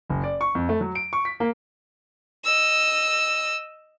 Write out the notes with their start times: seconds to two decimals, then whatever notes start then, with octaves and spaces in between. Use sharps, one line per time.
0.10 F#1
0.23 D5
0.41 C#6
0.55 F2
0.69 A3
0.81 F#3
0.95 D7
1.13 C#6
1.25 B6
1.40 A#3
2.44 D#5 E6